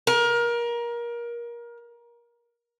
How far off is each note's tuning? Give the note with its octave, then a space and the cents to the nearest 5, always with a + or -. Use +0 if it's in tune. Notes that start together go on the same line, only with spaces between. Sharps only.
A#4 +25